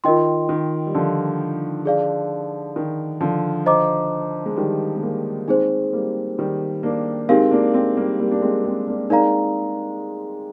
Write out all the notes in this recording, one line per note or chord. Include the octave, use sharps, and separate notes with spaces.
D#3 F4 A#4 D#5 G5 C6
D#3
G3
D3 F3
G#4 D5 F5
D#3
D3 F3
C5 D#5 A#5 D6
G#3
D#3 G3
G#3
G3 A#3
G#3 C4 D#4 G#4 C5
G3 A#3
D#3 G3
A#3 D4
G#3 C4 D#4 G4 A#4 F5
A#3 D4
G#3 C4
G3 A#3
G3 A#3
D4
G#3 C4
G#3 C4
A#3 D4
G#3 C4 D#4 A#4 D5 F5 A#5